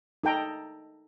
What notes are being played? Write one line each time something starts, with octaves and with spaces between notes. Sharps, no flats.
D#4 A4 G5 A#5